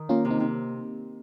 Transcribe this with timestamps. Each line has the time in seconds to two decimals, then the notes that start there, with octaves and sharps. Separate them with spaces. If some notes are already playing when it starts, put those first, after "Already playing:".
Already playing: D#3
0.09 A#3 C#4 F4
0.25 C3
0.31 C4 D#4
0.40 C3